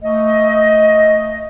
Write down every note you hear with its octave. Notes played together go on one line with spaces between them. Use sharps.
A3 D#5